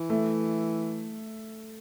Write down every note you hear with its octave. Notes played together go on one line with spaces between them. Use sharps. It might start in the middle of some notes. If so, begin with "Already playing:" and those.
Already playing: E3
A3